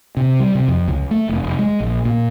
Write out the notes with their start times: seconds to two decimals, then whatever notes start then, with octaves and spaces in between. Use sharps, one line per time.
0.17 C3
0.40 G3
0.55 C3
0.68 F2
0.88 C#2
1.11 A3
1.29 F1
1.43 F1
1.59 G#3
1.80 A#1
2.05 A#2